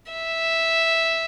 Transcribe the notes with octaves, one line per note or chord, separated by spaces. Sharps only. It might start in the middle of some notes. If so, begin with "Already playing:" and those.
E5